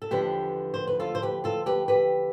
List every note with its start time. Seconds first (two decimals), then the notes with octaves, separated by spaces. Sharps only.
0.02 A4
0.11 E2 D3 F3 G4 B4
0.74 C5
0.87 B4
1.00 F4 A4
1.15 C5
1.22 G4 B4
1.44 F4 A4
1.66 G4 B4
1.88 G4 B4